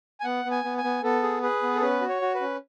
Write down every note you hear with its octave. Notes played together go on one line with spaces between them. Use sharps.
G#5
B3 F#5
B3
G#5
B3
G#5
B3
B3 A4
G#4
G#4 B4
B3
A4
C#4 B4
F#4
C#5
F#4
B4
C#4